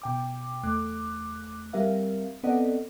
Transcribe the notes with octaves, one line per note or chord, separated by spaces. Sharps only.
B2 G5 D6
E2 A3 D6 F#6
G3 C4 G4 A#4 E5 F5
B3 C4 A4 D5 D#5 F#5